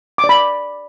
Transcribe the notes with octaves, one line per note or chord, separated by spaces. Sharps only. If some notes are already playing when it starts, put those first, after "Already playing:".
D6
D5
B5